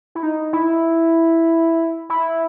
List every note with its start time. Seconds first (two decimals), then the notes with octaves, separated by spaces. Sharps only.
0.15 E4
0.23 D#4
0.53 E4
2.10 E4